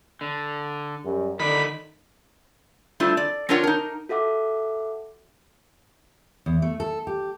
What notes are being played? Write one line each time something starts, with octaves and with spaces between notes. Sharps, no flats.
D3
F#2 G3
D3 D#3 D#4 D5 B5
G3 A3 C4 D4 E4 F4
D5
C4 D4 F4 A#4 C#5 F#5
D#4 A#4
F#4 A4 E5 F#5 D6
E2
A3
A4
G4